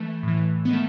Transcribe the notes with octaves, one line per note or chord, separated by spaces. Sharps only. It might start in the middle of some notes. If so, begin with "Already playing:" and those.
Already playing: E3 A3
A2 E3
D#3 B3
A3